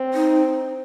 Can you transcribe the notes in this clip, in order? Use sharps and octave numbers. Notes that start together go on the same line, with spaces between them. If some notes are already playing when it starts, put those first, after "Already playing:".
Already playing: C4
D#4